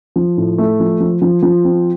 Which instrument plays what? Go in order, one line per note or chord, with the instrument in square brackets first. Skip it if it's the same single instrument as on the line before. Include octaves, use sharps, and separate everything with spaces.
[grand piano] F3
A2
A3
F3
F3
F3
F3
C4